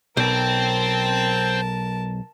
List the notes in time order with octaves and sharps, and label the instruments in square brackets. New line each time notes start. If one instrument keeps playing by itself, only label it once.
[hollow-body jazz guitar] B1 [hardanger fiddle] A#4 A5 [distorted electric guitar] C5 G5